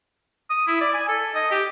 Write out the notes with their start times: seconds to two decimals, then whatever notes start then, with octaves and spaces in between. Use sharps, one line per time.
0.50 D#6
0.68 E4
0.81 D5
0.94 G#5
1.08 A4
1.35 D#5
1.51 G4